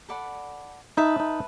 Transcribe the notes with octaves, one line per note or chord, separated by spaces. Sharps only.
A4 D5 F#5 B5
D#4 B4 E5 A5
D#4